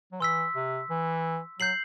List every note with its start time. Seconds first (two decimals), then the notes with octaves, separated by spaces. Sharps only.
0.12 F#3
0.20 E3 C6 E6 B6
0.55 C3
0.90 E3
1.59 F#3 G6 C7 F#7